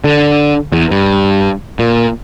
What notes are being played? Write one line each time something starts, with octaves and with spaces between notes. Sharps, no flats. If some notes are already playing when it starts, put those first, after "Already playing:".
D3
E2
G2
A#2